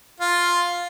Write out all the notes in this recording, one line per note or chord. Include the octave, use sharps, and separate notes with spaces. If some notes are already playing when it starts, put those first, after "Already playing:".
F4